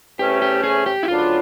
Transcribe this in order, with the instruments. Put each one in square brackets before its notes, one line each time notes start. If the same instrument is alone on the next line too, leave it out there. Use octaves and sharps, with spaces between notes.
[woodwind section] E2 C3 E3 A3 C#4 [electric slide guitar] G4
[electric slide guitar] G4
G#4
G4
E4
[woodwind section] D2 C#3 F#3 B3 D4 [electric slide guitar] F4